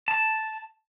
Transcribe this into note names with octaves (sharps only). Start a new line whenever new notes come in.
A5